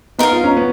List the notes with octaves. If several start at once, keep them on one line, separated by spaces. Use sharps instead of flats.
B3 D#4 A#4 F5
F4
C#4
B3